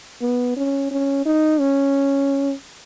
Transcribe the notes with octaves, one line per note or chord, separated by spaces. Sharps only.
B3
C#4
C#4
D#4
C#4